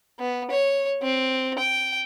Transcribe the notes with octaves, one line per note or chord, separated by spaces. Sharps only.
B3
C#5
C4
G5